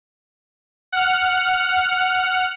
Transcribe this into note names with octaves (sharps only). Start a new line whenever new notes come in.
F#5 F6